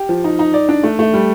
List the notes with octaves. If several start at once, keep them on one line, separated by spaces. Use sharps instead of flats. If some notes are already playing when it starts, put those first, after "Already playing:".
Already playing: G4
F3
D#4
D#4
D5
D4
A3
A3
G3